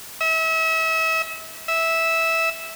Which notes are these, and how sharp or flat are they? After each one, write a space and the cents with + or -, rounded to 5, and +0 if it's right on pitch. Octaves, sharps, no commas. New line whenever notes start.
E5 -35
E5 -10